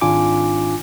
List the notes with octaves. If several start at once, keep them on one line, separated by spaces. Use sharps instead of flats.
G#1 D4 F4 G#5 D6